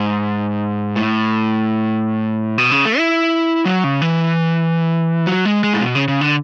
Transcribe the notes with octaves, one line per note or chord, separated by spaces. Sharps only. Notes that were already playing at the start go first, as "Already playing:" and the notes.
Already playing: G#2
A2
B2
C#3
A3
E4
F#3
C#3
E3
F#3
G#3
G#3
A2
B2
C#3
C#3
D3